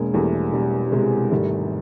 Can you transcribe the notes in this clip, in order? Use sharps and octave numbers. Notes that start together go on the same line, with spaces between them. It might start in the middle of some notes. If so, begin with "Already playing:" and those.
Already playing: E1 G#3 A#3
E2 G3 A3
E1 G3
G3
C3 G#3
G#1 G3 A3